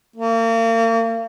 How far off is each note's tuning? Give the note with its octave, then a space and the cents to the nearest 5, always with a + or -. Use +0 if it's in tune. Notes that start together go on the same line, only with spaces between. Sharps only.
A#3 -40